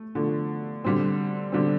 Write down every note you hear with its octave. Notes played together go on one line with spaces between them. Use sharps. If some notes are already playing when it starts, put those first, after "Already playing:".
Already playing: A3
D3 F3 A3
D3 G3 C4
D3 G3 C4